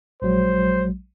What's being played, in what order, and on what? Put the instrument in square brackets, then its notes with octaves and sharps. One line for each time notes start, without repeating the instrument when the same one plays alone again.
[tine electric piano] A#1 F#3 G#3 [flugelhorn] C5